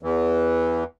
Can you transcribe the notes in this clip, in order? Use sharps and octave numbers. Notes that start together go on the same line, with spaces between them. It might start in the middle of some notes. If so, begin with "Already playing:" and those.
E2 E3